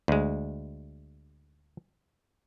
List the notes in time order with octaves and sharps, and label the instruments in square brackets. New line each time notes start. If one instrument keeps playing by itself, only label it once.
[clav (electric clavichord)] D2 G#3